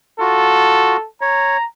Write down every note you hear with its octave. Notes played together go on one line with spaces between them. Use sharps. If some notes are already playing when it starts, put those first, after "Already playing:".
F4 F#4 A4
C#5 A#5